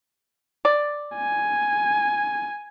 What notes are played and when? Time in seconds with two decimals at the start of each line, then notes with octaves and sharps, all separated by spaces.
0.65 D5
1.16 G#5